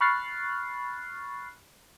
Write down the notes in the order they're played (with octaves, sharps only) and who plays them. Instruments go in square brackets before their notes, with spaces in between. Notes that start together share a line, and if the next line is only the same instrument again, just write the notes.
[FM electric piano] B5 C#6 F6 F#6 A6 C7